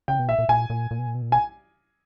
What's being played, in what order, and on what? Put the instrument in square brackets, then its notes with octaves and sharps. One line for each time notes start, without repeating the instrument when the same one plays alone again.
[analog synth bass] C#3 [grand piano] G5
[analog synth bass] B2
[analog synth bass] A#2 [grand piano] E5
[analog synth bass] A#2
[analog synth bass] A#2 [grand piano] G#5
[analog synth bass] A#2
A#2
B2
A#2
B2
A#2
[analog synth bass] B2 [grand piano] G#5